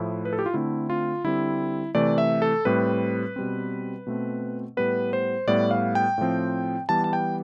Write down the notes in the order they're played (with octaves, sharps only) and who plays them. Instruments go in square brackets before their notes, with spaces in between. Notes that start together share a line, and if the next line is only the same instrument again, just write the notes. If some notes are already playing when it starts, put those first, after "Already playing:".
Already playing: [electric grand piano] A2 F3 A3 E4
B4
A4
G4
F4
D3 A3 C4 E4
F4
D3 G3 C4 E4
C3 E3 A3 D5
E5
A4
A2 G3 C4 B4
B2 G3 C4
B2 A3 C4
A2 G3 B3 B4
C5
A2 G3 B3 D5
F5
G5
A2 F3 C4
E3 G3 B3 A5
A5
G5